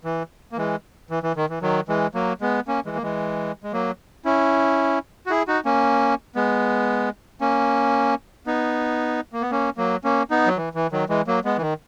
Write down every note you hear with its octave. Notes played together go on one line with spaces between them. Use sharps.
E3
A#3
E3 G#3
E3
E3
D#3
E3
D#3 F#3
E3 G#3
F#3 A#3
G#3 B3
A#3 C#4
E3 G#3
A#3
E3 G#3
G#3
F#3 A#3
C#4 E4
F#4
E4 G#4
D#4 F#4
A#3 C#4
G#3 B3
A#3 C#4
B3 D#4
A#3
B3
A#3 C#4
F#3 A#3
A#3 C#4
B3 D#4
F#3
E3
E3
D#3 F#3
E3 G#3
F#3 A#3
G#3 B3
E3
D#3